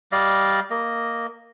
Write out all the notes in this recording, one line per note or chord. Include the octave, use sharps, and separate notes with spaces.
G3 D5 D#5 F5
A#3 D#5